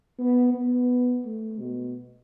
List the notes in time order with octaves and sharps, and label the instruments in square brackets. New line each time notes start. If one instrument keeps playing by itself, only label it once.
[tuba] B3
B3
A3
B2